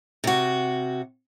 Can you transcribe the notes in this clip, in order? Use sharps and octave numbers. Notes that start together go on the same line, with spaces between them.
C3 F#4